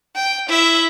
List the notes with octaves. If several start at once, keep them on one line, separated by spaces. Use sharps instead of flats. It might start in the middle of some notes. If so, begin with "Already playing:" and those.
G5
E4 E5